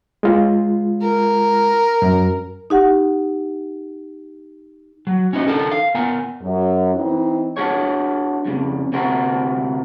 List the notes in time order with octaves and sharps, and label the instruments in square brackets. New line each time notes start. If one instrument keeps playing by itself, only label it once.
[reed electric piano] G#3 F4
[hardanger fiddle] A#4
[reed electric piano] F#2
[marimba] D#4 G4 F#5
[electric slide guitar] F#3
C#4 D#4 F#4 C5 D#5
D4 D#4 A4 A#4
F5
B3 A#4 G#5 A#5
[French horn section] F#2
E3 C4 D#4
[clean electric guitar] D4 F#4 G#4 C#5
F2 A#2 C#3
D2 C3 F#4 A#4 C5